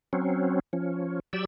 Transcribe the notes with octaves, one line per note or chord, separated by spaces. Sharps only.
F#3 C4 C#4
F3 C#4
F#3 G4 D5 E6